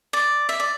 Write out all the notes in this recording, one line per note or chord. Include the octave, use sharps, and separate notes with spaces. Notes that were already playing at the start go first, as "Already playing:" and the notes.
D5
E5
D5